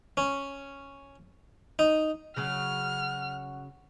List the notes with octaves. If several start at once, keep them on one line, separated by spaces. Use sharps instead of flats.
C#4
D#4
C#3 F#3 C#4 F#5 F6